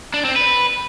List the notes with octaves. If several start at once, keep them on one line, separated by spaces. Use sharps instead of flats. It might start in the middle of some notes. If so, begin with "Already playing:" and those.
D4
C4
B4